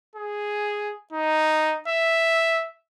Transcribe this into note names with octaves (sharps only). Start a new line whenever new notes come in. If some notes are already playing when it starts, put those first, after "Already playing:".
G#4
D#4
E5